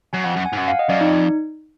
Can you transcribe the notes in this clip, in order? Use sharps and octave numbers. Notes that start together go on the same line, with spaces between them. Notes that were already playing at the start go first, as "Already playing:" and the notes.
F#2 G#5
F2 F#5
F#2
G#5
G#2
F#2 F#5
F5
D#5
F#2 D5
F2 D#4